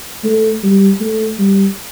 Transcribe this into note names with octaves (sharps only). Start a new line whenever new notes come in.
A3
G3
A3
G3